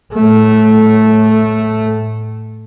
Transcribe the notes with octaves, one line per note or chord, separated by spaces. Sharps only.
A2 A3